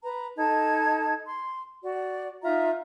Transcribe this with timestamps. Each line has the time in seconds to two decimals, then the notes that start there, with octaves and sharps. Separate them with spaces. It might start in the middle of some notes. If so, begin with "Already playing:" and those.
0.03 B4 A#5
0.37 D#4 A4 A5 G#6
1.25 C6
1.83 F#4 D5
2.43 D#4 F4 E5 A#5